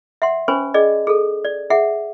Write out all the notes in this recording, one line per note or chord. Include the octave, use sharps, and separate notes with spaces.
E5 F#5 C6
C#4 B4 C5 G#5 B5 C#6
C#4 G#4 D5 D#5
G#4 A4
D5
G#4 E5 F#5